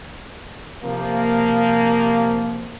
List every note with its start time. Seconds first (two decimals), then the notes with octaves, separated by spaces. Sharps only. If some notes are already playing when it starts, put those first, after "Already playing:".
0.84 C3 F3 A#3